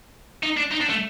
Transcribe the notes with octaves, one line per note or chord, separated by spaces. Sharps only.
D#4
D4
D#4
D4
A3